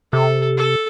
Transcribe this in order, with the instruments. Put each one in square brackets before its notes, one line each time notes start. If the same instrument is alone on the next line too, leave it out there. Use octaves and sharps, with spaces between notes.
[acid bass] C3 [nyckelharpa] A4
[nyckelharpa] A4